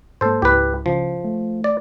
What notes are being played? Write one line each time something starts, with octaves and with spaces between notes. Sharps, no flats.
G#2 A#3 A4 C5
C#2 G#2 E4 G4 B4
C#3 F3
A3
D5